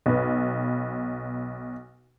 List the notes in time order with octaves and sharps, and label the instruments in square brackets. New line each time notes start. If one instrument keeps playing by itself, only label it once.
[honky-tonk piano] B1 B4